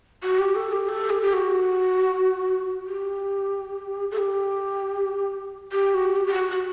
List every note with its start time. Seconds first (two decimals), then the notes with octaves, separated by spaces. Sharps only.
0.23 F#4
0.39 G4
0.56 A4
0.72 G4
0.89 A4
1.10 G4
1.22 G4
1.33 F#4
2.86 G4
4.11 A4
4.18 G4
5.72 G4
5.94 F#4
6.16 G4
6.27 G4
6.33 F#4
6.49 F#4